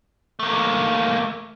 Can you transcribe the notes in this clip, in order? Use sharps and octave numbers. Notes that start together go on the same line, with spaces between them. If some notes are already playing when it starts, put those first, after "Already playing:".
A3 A#3